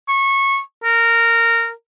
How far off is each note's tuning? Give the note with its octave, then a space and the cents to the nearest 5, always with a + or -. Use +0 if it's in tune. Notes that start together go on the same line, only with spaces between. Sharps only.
C#6 -20
A#4 -15